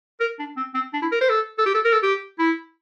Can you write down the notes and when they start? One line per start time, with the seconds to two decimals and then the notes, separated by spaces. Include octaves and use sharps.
0.20 A#4
0.39 D4
0.57 C4
0.74 C4
0.93 D4
1.02 E4
1.11 A#4
1.21 C5
1.29 A4
1.58 A4
1.66 G4
1.74 A4
1.84 A#4
1.93 A4
2.02 G4
2.39 E4